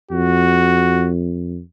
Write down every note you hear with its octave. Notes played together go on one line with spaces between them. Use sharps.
F2 F#4